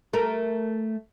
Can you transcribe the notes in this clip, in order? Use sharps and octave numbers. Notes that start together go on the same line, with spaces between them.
A3 A#4